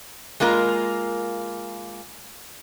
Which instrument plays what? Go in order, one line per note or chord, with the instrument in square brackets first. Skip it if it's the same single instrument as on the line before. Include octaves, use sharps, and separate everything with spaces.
[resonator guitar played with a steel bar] G#3 A#3 F4 A#4